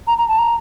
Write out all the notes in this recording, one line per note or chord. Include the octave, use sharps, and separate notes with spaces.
A#5
A#5
A5
A#5